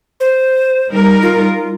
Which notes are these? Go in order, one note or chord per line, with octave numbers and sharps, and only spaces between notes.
C5
G3 D#4 A#4
F4